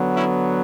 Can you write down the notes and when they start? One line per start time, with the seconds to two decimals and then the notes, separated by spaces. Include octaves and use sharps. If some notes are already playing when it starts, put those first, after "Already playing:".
Already playing: D3 F#3 B3
0.15 C#4 E4